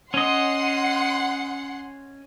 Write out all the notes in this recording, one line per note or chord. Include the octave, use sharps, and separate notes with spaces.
C#4 D#5 F#5 C6